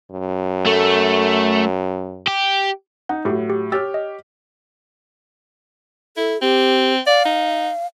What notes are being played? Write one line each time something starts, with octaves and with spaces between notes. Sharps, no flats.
F#2
A3
G4
D#4 F#5
A2 F#3 E4 G4
G4
G4 C#5 E6 F6 A6
D#5
E4 A4
C4 G4
D5 F5
D#4